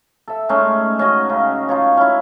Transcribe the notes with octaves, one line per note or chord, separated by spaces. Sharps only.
A4 E5
G#3 A3 C#4 D#4
C#4 F#4 D#5
C#3
D#4 F4 C#5
C#4 E4